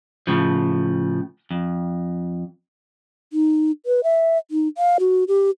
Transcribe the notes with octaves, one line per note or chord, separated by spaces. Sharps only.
A2 C#3 F3
F2
D#4
B4
E5
D#4
F5
F#4
G4